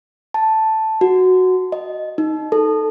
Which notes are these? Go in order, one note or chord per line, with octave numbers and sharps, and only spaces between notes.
A5
F#4
D#5
D#4
A4